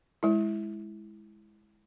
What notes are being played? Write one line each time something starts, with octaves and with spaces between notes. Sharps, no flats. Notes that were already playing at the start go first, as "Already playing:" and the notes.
G#3 E4